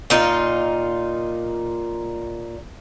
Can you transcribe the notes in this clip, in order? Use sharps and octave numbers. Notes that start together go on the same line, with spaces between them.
A#2 D#4 F4